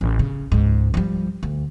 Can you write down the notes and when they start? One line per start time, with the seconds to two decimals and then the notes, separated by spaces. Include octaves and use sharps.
0.01 A1
0.19 C#3
0.52 C#2 G#2
0.94 F3 G3
1.43 D2